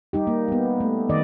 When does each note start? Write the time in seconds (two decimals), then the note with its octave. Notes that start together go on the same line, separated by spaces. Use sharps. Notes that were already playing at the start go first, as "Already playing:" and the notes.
0.13 G3 D#4 G4
0.27 A#3
0.48 G3 B3
0.80 A3
1.09 D#3 D5 D#5